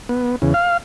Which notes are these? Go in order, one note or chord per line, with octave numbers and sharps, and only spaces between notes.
B3
E2 C#3
F5